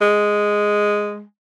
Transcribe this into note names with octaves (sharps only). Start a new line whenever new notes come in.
G#3